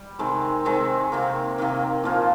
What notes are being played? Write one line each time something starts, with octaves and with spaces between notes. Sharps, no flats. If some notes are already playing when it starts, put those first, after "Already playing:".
Already playing: G3
C3 D#3 G#3 C4
C3 D#3 G#3 C4
C3 D#3 A#3
C3 D#3 A#3
A#2 F3 A#3 F4